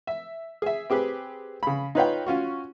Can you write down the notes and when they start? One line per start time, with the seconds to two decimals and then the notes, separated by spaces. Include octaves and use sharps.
0.07 E5
0.62 G#4 E5
0.90 C4 G4 G#4 B4
1.63 C#3 B5
1.95 D#4 F4 B4 C#5 F5 G5
2.26 C#4 F4 F#4